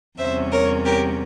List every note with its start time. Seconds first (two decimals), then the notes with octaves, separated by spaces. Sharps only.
0.18 E2 C3 G3 C#4 C5 E5
0.51 A#4 C#5
0.84 G4 A#4